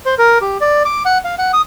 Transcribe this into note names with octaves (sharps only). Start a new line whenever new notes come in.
C5
A#4
G4
D5
D6
F#5
F5
F#5
D#6